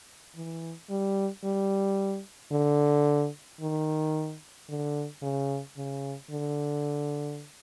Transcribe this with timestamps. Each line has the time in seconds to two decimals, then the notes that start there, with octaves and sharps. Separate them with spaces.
0.36 E3
0.90 G3
1.44 G3
2.52 D3
3.60 D#3
4.69 D3
5.22 C#3
5.77 C#3
6.31 D3